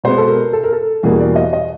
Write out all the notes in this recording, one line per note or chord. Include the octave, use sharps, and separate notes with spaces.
B2 G#3 B3 C5
A4
A#4
A4
A#4
A4
E2 B2 G3 A#3 G#4
D5
D#5
D#5